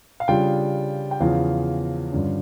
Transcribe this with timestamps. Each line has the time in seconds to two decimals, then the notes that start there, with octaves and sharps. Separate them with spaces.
0.20 F5
0.28 C#3 G3 D4 F4 G5
1.11 G5
1.20 E2 C#3 F3 F5
2.12 G2 D3 F3 C#4